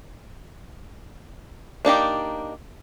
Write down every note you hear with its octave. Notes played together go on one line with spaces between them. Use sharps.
A#3 D4 D#4 G4